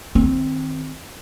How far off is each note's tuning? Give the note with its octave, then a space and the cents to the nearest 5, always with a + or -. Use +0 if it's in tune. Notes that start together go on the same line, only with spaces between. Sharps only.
D#3 +0 C4 +0